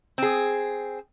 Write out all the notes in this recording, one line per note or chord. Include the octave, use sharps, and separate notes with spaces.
C4 G#4